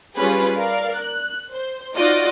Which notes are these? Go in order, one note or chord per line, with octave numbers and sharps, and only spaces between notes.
G3 C#4 F4 G4 G#4 B4
A#4 D5 F5
F#6
C5
D#4 F4 F#4 D5 D#5